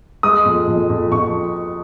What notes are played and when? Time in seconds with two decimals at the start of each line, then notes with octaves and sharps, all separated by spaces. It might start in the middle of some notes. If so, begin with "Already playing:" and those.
0.23 G#3 D#6
0.45 F2
0.67 F2
0.90 F2
1.12 F2 C#6